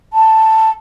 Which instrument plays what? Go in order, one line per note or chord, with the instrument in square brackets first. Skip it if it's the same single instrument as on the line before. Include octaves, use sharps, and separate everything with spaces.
[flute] A5